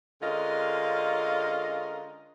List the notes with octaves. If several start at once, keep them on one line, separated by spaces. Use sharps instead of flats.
D3 G#3 C#4 F4 A#4 D#5